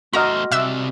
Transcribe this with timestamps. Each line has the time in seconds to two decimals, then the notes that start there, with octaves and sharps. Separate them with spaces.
0.13 A3 F#4 C5 D#5 A#5 C6 F6
0.52 C3 D5 E5 E6 F#6